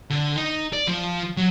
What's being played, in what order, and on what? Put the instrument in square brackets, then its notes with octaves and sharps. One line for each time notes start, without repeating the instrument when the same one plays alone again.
[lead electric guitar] D3
D#4
D5
F3
F#3